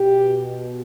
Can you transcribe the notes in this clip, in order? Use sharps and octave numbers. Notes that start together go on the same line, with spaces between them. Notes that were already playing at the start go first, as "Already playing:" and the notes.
Already playing: B2 G4